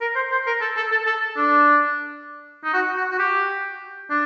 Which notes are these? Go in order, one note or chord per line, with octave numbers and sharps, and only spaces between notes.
A#4
C5
C5
A#4
A4
A4
A4
A4
D4
D#4
F#4
F#4
F#4
G4
D4